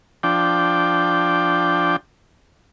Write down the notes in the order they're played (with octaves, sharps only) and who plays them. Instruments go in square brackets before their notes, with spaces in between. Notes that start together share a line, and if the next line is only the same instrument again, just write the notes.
[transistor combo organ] F3 D4 G5